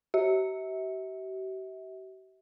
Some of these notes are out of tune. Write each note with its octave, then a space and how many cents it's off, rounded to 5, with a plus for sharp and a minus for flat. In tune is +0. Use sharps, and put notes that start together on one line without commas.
G4 -45 E5 -35